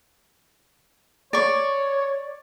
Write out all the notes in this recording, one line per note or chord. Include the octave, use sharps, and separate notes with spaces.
C#5 D5 C#6